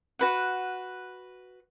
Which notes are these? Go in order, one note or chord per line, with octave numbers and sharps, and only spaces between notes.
F#4 B4 F#5